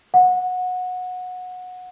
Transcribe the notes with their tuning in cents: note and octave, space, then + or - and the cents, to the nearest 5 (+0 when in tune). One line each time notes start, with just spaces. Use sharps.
F#5 -20